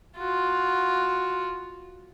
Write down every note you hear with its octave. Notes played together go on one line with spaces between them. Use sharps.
F4 F#4